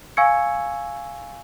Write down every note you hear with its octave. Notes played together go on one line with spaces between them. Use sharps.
F5 G#5 C#6 E6 G#6 C#7